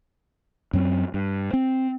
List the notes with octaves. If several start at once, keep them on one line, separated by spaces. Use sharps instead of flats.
F#2 F#3 C4
G2
C4